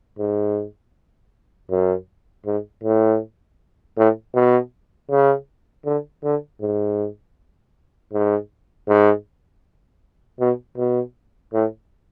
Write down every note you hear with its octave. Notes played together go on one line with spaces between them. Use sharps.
G#2
F#2
G#2
A2
A2
B2
C#3
D3
D3
G#2
G#2
G#2
B2
B2
A2